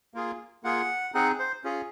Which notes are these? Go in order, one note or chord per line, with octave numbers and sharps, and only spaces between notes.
A#3 F4 G#4
A#3 F4 G#4 F#5
C4 D#4 G#4 F#5
C5
C#4 F4 G#4